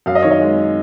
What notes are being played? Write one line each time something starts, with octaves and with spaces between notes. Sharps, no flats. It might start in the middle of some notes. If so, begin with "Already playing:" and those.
F#2 F5
D#5
D#3 C#5
D#5
G#3